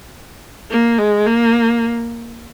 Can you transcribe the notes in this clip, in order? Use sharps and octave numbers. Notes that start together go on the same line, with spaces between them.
A#3
G#3
A#3